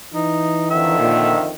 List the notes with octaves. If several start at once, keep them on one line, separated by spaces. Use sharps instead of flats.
E3 D#4
F2 D3 D#3 E5
A#2